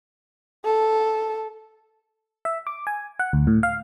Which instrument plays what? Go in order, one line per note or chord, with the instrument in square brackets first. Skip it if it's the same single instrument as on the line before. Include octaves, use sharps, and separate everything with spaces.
[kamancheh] A4
[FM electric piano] E5
D6
G#5
F#5
D2
A2
F5